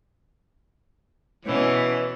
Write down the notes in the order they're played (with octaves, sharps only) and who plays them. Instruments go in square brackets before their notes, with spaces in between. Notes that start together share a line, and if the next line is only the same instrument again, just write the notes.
[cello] B2 C#4 [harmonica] E3